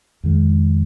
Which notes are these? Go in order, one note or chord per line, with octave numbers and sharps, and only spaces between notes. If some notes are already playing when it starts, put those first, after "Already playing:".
F2 D#3 G#3